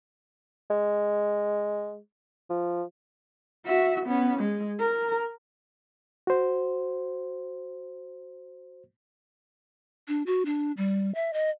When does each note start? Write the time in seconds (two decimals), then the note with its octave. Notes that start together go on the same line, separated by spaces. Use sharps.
0.70 G#3
2.50 F3
3.66 F#4 E5
4.06 B3 C#4
4.39 G#3
4.80 A#4
6.27 F#4 C5
10.08 D4
10.26 F#4
10.46 D4
10.77 G3
11.15 E5
11.33 D#5